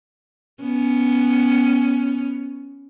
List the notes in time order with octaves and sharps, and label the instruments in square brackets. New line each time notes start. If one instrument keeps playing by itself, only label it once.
[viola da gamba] B3 C#4